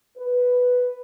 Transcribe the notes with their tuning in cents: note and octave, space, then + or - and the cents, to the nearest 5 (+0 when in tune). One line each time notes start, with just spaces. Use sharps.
B4 +0